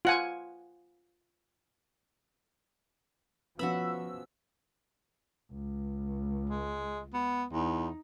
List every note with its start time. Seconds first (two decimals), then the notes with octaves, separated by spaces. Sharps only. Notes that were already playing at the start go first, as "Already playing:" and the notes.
0.05 F4 F#5 G#5
3.59 F3 B3 C#4 F#4 E5 B5 E6
5.52 C#2
6.50 G#3
7.14 B3
7.52 E2 D#4